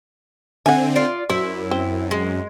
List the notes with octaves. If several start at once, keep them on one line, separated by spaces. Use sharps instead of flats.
D3 C4 E5 F#5 G#5
F4 D5
F#2 E4 C5
C4
G#3